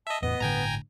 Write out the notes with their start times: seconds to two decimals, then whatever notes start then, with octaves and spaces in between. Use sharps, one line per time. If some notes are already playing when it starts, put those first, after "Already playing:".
0.07 D#5 E5 A5
0.22 E2 A2 B3 D#5
0.40 G1 A2 D3 G5 G#5 A#5